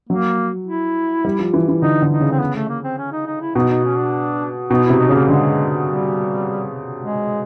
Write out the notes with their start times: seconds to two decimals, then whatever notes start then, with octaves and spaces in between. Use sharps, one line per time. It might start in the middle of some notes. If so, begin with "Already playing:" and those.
0.09 F#3 A#3
0.67 E4
1.25 G3
1.39 F3
1.54 E3
1.68 E3
1.82 D3 D#4
2.02 D3
2.11 D#4
2.21 C#3
2.31 C4
2.40 B3
2.55 A3
2.69 A#3
2.84 C4
2.98 C#4
3.12 D#4
3.26 D#4
3.41 E4
3.55 B2 D#4
3.70 D#4
3.85 C#4
3.98 D4
4.70 B2 D#4
4.85 C3 E4
4.99 D#4
5.09 C#3 A#3
5.28 D3 G#3
5.86 G3
7.01 G#3